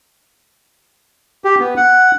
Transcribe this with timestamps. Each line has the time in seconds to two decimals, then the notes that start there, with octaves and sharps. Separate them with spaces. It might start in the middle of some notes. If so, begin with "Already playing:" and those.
1.44 G4
1.60 B3
1.77 F#5